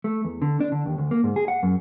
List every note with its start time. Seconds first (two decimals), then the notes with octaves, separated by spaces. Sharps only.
0.04 A3
0.24 E2
0.42 D3
0.60 D4
0.72 D3
0.86 D#2
0.98 D2
1.11 A#3
1.24 G#2
1.36 G#4
1.48 F#5
1.63 F#2